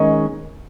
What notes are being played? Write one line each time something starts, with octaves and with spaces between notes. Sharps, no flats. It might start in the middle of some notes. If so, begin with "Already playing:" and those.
Already playing: D#3 G#3 C#4